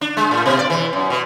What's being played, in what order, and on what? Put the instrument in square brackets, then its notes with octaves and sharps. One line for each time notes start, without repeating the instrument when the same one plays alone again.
[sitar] D4
G#3
A2
B2
D5
E3
F#2
B2